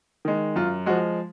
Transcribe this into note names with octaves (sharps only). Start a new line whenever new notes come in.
D#3 G#3
F#2 F4
F3 G#3 F#4